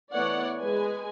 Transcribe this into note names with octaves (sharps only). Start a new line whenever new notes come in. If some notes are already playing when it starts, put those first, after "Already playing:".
E3 A3 B3 C#5 D5 F#5
G#3 B4 G#5